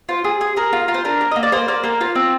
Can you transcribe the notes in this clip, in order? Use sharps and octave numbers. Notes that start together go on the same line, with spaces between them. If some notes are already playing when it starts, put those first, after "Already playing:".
F4 C5
G#4
G#4
G#4 A#4
F4
F4
C5
D4 A#4
A#3
A#3 D#5
D5
A#3 C5
A#3 D5
A#3 A#4
F4 C5
C4